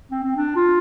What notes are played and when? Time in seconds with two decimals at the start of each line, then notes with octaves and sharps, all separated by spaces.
0.11 C4
0.24 C4
0.36 D4
0.56 F4